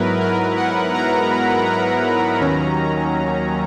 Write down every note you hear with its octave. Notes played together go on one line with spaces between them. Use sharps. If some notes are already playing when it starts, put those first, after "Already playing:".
Already playing: G#2 F#3 B3 E4 A#4 B4
A#4
F#5
A#5
B5
A#5
D#2 D#3 F#3 C#4